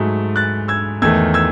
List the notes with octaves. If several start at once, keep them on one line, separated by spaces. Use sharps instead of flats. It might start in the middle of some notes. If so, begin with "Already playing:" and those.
Already playing: G#2 F#3 A3
F#6 A6
E6 G#6
E2 D#3 A3 E6 G#6
E6 G#6